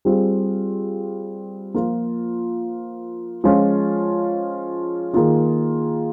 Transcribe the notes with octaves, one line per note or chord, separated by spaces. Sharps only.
G3 C4 F4 G#4
F3 A#3 F4
F3 G#3 C#4 F4
D#3 A#3 F4 G#4